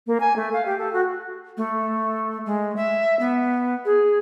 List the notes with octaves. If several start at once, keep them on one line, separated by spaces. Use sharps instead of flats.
A#3
G#5
A3
F5
G4
A4
F#4
A3
G#3
E5
B3
G#4